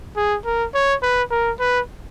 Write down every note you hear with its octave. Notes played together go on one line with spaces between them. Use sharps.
G#4
A#4
C#5
B4
A#4
B4